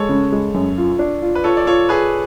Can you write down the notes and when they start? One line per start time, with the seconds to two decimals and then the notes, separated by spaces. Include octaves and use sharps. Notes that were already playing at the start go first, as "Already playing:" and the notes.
Already playing: G#3 A4 C#5
0.09 C#3
0.32 G#3
0.54 F#2
0.78 F4
0.99 D4
1.22 F4
1.35 B4
1.44 F4 A4 C#5
1.57 D5
1.67 F4 A4 C#5
1.89 F4 G#4 B4